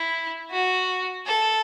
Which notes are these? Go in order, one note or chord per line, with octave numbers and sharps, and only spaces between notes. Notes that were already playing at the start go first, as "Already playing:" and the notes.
Already playing: E4
F#4
A4